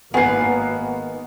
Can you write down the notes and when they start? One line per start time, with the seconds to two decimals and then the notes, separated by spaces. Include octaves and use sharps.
0.14 G#1 D#3 A#3 B3 B4 G#5 C7